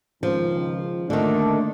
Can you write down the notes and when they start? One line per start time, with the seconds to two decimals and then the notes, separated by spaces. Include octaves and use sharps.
0.23 C#2 D#3 F3
1.10 D3 D#3 A3 A#3 D4